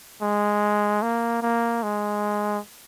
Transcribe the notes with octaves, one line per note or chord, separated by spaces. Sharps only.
G#3
A#3
A#3
G#3